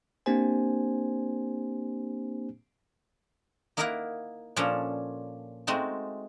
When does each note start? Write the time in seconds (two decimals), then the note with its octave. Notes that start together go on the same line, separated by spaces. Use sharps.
0.26 A#3 C4 D4 G4 C5 G#5
3.77 A#3 D#4 E4 A#4 F5 F#5
4.56 A#2 F3 C#4 D4 A4 A#5
5.67 G#3 A3 C4 D#4 F#4